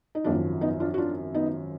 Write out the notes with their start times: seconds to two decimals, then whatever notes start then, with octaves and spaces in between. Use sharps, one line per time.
0.15 D#4
0.24 G#1 F#2 F3 A#3 D4
0.61 B3 D#4
0.80 D4 F4
0.94 F#4
0.98 D4 F4
1.35 B3 D#4